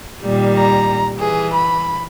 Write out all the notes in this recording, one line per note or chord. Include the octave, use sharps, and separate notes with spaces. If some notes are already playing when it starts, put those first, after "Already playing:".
A#2 D#3 G3
A#5
E3 G#4
B5